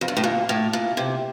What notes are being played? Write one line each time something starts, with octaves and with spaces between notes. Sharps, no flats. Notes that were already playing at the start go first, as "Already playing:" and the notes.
F2
G2
A2
A#2
A2
A#2
C3